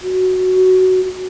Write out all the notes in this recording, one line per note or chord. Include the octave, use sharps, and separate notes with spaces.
F#4